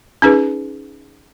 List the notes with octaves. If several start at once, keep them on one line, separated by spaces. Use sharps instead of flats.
C#4 D#4 G#4 B4